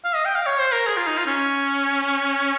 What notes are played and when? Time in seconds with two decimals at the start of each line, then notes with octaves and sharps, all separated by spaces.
0.05 F5
0.15 D#5
0.25 G5
0.35 F5
0.46 C#5
0.59 C5
0.72 A#4
0.87 G#4
0.97 F4
1.07 D#4
1.17 F4
1.26 C#4